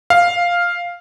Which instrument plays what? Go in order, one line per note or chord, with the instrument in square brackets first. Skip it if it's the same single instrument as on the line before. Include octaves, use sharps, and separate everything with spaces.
[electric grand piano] F5